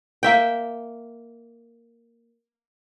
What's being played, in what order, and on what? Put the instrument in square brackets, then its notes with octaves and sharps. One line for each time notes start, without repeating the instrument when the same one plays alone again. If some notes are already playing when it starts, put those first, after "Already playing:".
[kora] A#3 E5 G5